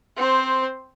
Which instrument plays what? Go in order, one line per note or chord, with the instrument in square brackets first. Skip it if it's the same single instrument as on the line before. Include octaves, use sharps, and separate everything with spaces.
[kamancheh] C4 C5